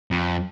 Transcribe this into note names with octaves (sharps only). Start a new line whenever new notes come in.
F2